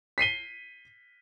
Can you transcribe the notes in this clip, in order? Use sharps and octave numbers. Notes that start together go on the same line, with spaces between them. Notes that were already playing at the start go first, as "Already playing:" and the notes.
B6 C7 D#7 G7